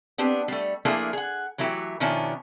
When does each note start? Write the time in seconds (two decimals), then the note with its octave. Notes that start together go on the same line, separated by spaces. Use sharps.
0.18 B3 C4 D4 G4
0.48 G3 A3
0.85 F3 A3 A#3 D4 E4 G#4
1.13 G#4 F#5
1.58 E3 F#3 A3 E4 G4
2.00 B2 D#3 F3 C#4 D4 E4